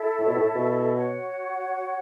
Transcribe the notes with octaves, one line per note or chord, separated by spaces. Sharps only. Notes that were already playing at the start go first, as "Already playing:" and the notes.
Already playing: E4 A4 E5
A2
B2
A2
B2
F#4 C#5 F#5